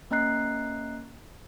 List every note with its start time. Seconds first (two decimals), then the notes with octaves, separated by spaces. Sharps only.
0.11 A#3 C#4 D#5 A#5 F#6 C7